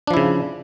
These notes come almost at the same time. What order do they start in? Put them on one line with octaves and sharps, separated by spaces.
D4 F3 E4 C#3